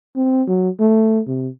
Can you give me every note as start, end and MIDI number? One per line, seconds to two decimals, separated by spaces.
0.16 0.43 60
0.48 0.69 54
0.80 1.20 57
1.27 1.48 48